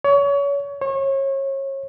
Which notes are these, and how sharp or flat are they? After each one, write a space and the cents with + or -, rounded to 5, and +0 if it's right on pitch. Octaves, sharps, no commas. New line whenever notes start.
C#5 +30
C#5 -30